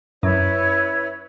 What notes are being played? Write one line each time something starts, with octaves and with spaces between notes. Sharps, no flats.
F#2 E4 B4 C#5